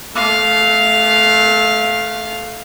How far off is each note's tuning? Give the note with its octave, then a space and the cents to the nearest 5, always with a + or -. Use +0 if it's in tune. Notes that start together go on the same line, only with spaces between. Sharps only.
A3 -30 F5 +0